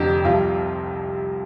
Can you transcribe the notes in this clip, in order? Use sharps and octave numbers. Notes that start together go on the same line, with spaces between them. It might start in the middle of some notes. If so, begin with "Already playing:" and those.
Already playing: F1 F2 D3 G4
C2 C3 F3 F4